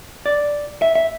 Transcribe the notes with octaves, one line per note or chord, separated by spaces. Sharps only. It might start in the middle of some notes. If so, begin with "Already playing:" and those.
D5
E5
E5